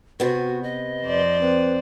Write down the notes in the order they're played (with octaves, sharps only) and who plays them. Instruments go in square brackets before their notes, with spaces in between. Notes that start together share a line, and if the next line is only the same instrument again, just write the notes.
[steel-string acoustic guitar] C3 B3 [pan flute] F#4
[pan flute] D#5
[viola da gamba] F2 C5 D5
[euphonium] C4 [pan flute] B4